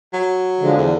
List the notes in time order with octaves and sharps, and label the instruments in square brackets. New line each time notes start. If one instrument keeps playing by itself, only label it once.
[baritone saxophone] F#3
[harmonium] D3 F3 G#3
[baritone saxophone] E2 [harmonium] D3